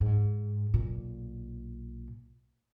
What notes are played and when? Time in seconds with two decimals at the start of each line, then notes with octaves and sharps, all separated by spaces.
0.01 G#2
0.74 B1 A#2